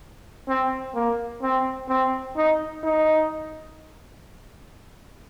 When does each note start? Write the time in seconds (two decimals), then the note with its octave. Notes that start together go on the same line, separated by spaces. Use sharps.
0.48 C4
0.95 A#3
1.43 C4
1.89 C4
2.36 D#4
2.84 D#4